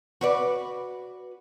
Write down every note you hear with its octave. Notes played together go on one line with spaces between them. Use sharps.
F#4 B4 D5